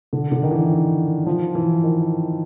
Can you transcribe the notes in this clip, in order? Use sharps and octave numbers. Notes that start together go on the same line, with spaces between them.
D3
D3
D#3
E3
F3
E3
D#3